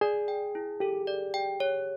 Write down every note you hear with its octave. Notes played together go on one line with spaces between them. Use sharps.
G#4 D5
G5
E4
G4 A4
D5
G5
C#5